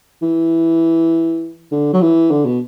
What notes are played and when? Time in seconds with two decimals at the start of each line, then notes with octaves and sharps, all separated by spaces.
0.22 E3
1.71 D3
1.93 F#3
2.01 E3
2.31 D3
2.46 B2